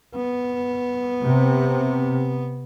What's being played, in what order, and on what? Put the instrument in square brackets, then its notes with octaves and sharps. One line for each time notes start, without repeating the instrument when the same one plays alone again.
[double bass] B3
[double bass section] C3